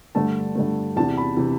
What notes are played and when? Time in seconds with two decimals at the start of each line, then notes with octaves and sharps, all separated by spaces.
0.15 G2 D3 A3 A5
0.55 G2 D3 A3
0.96 E2 C3 E3 A5
1.17 B5
1.37 C3 E3